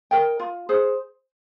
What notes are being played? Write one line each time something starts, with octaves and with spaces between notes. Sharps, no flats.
A#4 D#5 G5
F4
G#4 C5